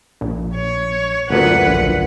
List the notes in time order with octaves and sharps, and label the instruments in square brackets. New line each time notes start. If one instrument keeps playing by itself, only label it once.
[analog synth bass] A#1
[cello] C#5
[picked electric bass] F#1 D2 A#2 [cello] B4 F#5
[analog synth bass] A#1